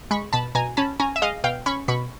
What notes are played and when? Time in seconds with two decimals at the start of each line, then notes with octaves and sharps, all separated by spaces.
0.11 G#3 B5 C#6
0.33 B2 A5 B5
0.55 B2 G#5 A#5
0.77 C#4 A5 B5
1.00 C#4 G#5 A#5
1.16 E5
1.22 G#3 D#5 F5
1.44 B2 F5 G5
1.66 C#4 B5 C#6
1.88 B2 B5 C#6